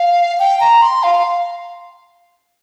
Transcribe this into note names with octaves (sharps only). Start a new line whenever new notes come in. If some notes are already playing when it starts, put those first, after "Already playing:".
Already playing: F5
G5
A#5
C6
F5